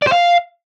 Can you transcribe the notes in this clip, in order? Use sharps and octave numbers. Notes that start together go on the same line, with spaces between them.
D5
C5
F5